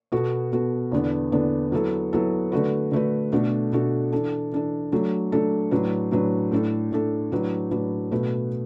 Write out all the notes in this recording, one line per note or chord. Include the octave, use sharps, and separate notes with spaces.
B2 B3 F#4 A4
B2 B3 F#4 A4
E2 D3 B3 D4
E2 D3 B3 D4
F#3 B3 E4 A4
F#3 B3 E4 A4
D3 A3 F#4 B4
D3 A3 F#4 B4
B2 A3 D4 F#4 A4
B2 A3 D4 F#4 A4
E3 D4 A4
E3 D4 A4
F#3 A3 D4 A4
F#3 A3 D4 A4
A2 F#3 D4 B4
A2 F#3 D4 B4
A2 A3 D4 A4
A2 A3 D4 A4
A2 F#3 D4 B4
A2 F#3 D4 B4
B2 A3 F#4 B4